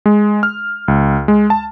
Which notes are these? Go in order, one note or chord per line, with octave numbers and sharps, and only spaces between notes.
G#3
F6
C#2
G#3
A5